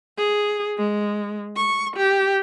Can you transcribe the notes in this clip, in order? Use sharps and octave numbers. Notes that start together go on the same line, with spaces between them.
G#4
G#3
C#6
G4